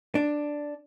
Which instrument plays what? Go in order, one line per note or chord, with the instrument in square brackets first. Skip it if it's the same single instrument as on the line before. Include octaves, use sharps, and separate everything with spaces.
[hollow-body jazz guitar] D4